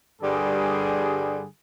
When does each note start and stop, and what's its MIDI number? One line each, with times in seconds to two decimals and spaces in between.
0.21 1.44 43
0.21 1.44 50
0.21 1.44 55
0.21 1.44 68